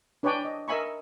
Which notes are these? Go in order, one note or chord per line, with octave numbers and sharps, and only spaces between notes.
D4 B4 C#5 D5 G5 G#5
D#5
A#4 D#5 E5 G#5 B5 C#6